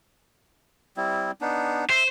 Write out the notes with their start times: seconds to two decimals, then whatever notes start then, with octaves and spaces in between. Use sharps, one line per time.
0.97 G3 C4 E4
1.41 B3 D4 D#4
1.90 C5 E5